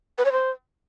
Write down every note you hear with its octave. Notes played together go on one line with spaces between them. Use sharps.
B4
C#5
C5